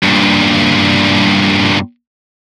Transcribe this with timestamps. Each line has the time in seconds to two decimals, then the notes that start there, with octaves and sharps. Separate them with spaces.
0.03 G2 A#2